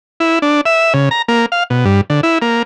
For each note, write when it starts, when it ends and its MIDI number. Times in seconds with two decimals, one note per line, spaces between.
0.20 0.39 64
0.42 0.61 62
0.66 0.93 76
0.94 1.09 49
1.11 1.22 82
1.28 1.46 58
1.52 1.63 77
1.70 1.85 47
1.85 2.01 43
2.10 2.21 50
2.23 2.38 64
2.42 2.63 58